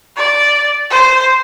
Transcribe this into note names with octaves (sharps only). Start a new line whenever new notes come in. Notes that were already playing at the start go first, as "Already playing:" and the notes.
D5
C5